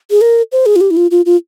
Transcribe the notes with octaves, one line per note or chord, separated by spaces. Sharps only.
G#4
A#4
C5
G#4
F4
G4
E4
F4
F4
F4